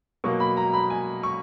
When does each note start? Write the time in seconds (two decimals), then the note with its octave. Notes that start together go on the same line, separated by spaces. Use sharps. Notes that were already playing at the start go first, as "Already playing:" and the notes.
0.24 B2 F#3 A#3 C#6
0.40 B5
0.57 A#5
0.73 B5
0.90 G#5
1.23 C#6